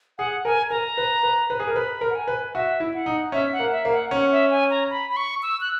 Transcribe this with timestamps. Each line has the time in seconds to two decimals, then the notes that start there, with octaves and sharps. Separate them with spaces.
0.18 G#4 F#5
0.44 A#4 G#5
0.70 A#4 A#5
0.97 B4
1.23 B4
1.50 B4
1.60 G#4
1.67 A#4
1.75 B4 B5
2.01 A#4
2.10 F#5
2.15 G#5
2.28 B4
2.54 F#4 E5
2.80 E4
2.94 F#5
3.06 D#4
3.32 C#4 E5
3.53 F#5
3.59 A#3
3.72 E5
3.85 A#3
3.92 F#5
4.11 C#4 F#5
4.31 E5
4.50 G#5
4.70 A#5
4.90 B5
5.10 B5
5.17 C#6
5.42 E6
5.61 F#6